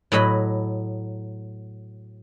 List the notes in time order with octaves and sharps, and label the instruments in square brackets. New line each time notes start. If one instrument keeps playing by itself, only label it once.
[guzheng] A2 F#3 D#5 B5